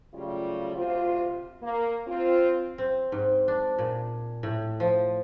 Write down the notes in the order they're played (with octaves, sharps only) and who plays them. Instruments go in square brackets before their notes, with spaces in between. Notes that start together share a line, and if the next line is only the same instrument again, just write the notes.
[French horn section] C#3 F#3 G3 A3 F4
D2 C3 F4
A#3
C4 F4
[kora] C4
G#2
D4
A#2
A2
F3